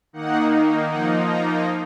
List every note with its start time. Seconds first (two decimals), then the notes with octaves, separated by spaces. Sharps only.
0.13 D#3 A#3 D#4 F#5
0.89 F3 A#3 D#4 F#5
1.28 A#5